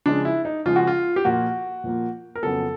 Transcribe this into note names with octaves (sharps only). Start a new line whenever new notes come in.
C#3 F3 G#3 D4
E4
D#4
C#3 F3 G#3 F4
F#4
F4
G4
A#2 F3 A#3 F#4
A#2 F3 A#3
A#4
F2 C#3 F#3 B3 A4